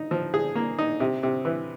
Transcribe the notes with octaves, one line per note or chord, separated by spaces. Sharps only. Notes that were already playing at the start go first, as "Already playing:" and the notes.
Already playing: D#4
F3
G#4
A#3
D#4
C3
C3
E3